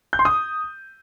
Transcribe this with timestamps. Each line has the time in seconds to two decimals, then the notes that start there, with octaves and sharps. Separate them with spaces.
0.13 G6
0.19 C6
0.25 D#6